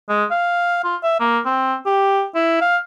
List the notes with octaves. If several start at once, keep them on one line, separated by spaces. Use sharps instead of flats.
G#3
F5
F4
E5
A#3
C4
G4
E4
F5